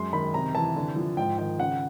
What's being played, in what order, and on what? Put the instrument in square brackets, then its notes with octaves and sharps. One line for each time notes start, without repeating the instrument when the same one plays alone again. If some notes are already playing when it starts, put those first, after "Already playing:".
Already playing: [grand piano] F#2 G#3 C6
D#3 B5
C3 A#5
E3 A5
D3
F3
G#2 G5
D#3 G5
C#3 F#5